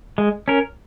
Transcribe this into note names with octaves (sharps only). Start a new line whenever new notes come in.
G#3
C#4 A#4